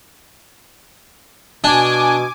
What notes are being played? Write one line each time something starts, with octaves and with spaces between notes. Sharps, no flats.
B2 D4 G#5 D6